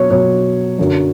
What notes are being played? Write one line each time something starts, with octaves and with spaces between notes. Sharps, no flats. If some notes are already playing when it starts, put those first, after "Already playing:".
Already playing: B2 F#3 C#5
B2 F#3 C#5
F#2 D3 F#3